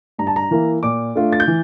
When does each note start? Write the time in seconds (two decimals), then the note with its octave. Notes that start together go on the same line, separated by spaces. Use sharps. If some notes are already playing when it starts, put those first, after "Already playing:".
0.18 G2 A#5
0.27 A5
0.36 A#5
0.51 E3 A#3 E4
0.83 A#2 D6
1.16 A3 D4 F4
1.33 A6
1.40 G6
1.47 E3